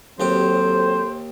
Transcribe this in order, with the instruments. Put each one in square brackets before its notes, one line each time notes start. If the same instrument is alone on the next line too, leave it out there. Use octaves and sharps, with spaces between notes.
[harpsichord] D#2 G4 [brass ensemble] F#3 C4 [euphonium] A4 [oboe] C5